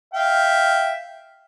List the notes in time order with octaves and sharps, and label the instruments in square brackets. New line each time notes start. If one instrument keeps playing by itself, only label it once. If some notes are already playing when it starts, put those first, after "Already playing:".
[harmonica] E5 F5 G5